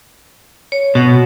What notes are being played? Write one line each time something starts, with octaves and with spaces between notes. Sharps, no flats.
C#5
B2 F#4 F#5